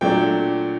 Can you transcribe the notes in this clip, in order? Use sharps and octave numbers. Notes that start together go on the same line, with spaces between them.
A#2 F#3 A3 D4 G5